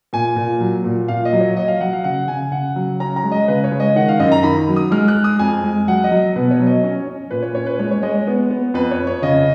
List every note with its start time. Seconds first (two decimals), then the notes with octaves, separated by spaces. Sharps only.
0.13 A#2 G#5
0.36 A#2
0.61 F#3
0.84 A#2
1.08 A#2 F5
1.25 D#5
1.33 F#3
1.40 C#5
1.57 F#3 D#5
1.68 F5
1.81 F#3 F#5
1.93 F5
2.04 C#3 F#5
2.28 C#3 G#5
2.52 C#3 F#5
2.76 F#3
3.00 C#4 A#5
3.16 A#5
3.24 G#3
3.32 D#5
3.48 C#3 B4
3.64 C#5
3.71 G#3
3.80 D#5
3.96 D#3 F#5
4.09 F5
4.19 F#2 D#5
4.32 A#5
4.43 D#3 B5
4.68 F#3
4.76 D#6
4.91 G#3 F6
5.08 F#6
5.16 G#3
5.24 D#6
5.39 F2 G#5
5.64 G#3
5.88 F#3 F#5
6.04 D#5
6.12 F#3
6.36 B2 B4
6.51 C#5
6.60 F#3
6.67 D#5
6.83 C#4 C#5
7.07 C#4
7.31 A#2 B4
7.42 C#5
7.55 C#4 C#5
7.66 B4
7.79 G#3 C#5
7.91 C#5
8.02 G#3 D#5
8.15 C#5
8.27 B3
8.50 B3
8.74 F2 B4
8.91 C#5
8.98 F2
9.07 C#5
9.22 C#3 D#5